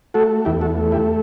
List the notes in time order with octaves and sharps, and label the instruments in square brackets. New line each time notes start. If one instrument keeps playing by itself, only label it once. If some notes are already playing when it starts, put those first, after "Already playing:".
[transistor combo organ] A3 F#4 A4
E2 E4 G4
F#4 A4
A3
E4 G4